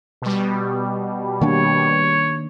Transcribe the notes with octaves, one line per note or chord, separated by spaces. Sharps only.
B2 G3
D#3 A#3 D4 C#5